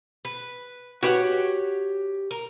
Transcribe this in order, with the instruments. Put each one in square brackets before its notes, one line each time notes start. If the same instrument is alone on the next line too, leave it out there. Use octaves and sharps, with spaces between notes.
[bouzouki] B4
[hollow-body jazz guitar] F#4 B4 F#5 [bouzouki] G4 C#5
[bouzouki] A#4